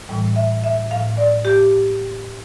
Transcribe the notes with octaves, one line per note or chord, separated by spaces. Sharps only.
A2 E3 G3
E5
E5
A2 F3 F5
D5
G4